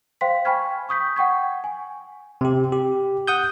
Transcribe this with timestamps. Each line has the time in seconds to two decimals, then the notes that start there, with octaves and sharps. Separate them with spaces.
0.21 C5 F5 G5 C6 B6
0.45 G5 G#5 B5 C#6 F6 G#6
0.89 C#6 D#6 G6 B6
1.16 F#5 G5 C#6 G#6
1.64 G#5
2.41 C3 G4
2.72 G4
3.27 F#5 D#6 G6